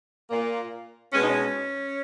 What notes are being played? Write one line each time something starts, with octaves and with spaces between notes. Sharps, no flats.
A#2 A#3
B2 G#3 B3 C#4
D#4
C#4